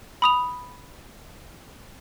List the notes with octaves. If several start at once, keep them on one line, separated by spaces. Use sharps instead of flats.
B5 D#6 F7